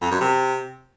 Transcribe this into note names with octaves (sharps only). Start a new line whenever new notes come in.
F2
F#2
C3